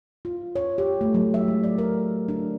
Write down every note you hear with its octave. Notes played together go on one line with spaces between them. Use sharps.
F4
C#5
G4
A3
F#3
E5
G#3
D5
A#4
D4